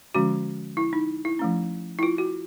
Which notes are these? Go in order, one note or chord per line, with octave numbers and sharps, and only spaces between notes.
D3 F3 G#3 C#4 F#4
E4
D#4
E4
F3 A3 C#4
E4
F4
F#4